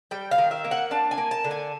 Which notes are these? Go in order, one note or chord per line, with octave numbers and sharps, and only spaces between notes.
G3 G5
F5
D#3
E5
A#3
F#5
D4 A5
G#5
A#3
A5
D3
G#5